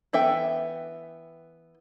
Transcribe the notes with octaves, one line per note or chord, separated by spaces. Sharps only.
E3 B3 A4 E5 G5